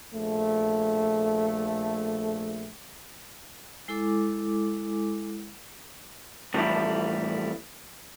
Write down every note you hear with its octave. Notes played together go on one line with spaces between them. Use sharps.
A#1 A3
G#3 E4 A4 G#5 D6
A2 E3 F3 G3 E4